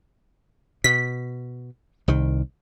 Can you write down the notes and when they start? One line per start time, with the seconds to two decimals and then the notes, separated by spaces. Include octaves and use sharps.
0.84 B2 B6
2.08 C2 D#3